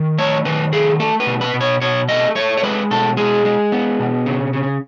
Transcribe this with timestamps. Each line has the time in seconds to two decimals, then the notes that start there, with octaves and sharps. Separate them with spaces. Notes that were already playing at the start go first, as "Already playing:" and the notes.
Already playing: D#3
0.18 A3 C#5
0.45 D#3 B4
0.73 A3 G#4
1.00 A3 A4
1.20 B4
1.27 B2
1.41 B4
1.54 B2
1.61 C#5
1.81 B2 C#5
2.09 A3 D#5
2.35 A3 C#5
2.57 C#5
2.63 G#3 B4
2.91 B2 A4
3.17 G#3 G#4
3.45 G#3
3.72 B3
3.99 B2
4.26 C#3
4.53 C#3